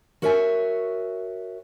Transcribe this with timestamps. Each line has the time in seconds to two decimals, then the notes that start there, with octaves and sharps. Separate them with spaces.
0.22 F#4 A#4 C#5 E5 F#5 G#5